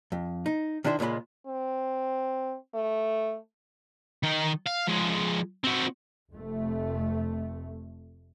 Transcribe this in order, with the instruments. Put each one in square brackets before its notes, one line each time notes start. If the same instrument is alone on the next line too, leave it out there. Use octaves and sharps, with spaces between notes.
[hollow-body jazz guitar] F2
D#4
D#3 D4 E4 G4 C5
C#2 A#2 G#3 F4 B5
[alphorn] C4
A3
[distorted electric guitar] D#3 D#4
F5
F3 G#3
C4 F#4
[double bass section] F1 F2 A3